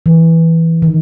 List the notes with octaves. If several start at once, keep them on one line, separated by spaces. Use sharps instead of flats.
E3
D#3